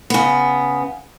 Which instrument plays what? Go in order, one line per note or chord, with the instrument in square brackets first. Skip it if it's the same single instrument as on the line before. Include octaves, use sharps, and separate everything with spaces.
[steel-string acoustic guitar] C#3 B3